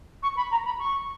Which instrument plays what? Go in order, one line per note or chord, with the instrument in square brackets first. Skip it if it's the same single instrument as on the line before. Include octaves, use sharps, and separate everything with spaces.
[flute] C#6
B5
A#5
B5
C#6